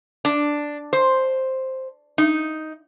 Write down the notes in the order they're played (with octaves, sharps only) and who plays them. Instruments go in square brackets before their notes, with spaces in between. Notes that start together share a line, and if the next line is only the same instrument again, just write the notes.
[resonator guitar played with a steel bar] D4
C5
D#4